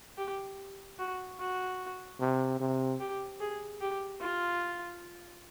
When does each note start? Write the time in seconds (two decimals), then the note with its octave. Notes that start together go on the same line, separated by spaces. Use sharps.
0.18 G4
0.99 F#4
1.40 F#4
2.20 C3
2.60 C3
3.00 G4
3.40 G#4
3.81 G4
4.21 F4